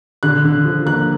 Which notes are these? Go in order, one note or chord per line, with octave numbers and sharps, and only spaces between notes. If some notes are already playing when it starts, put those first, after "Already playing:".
D3 F#6
D3
F3
A#3 F#6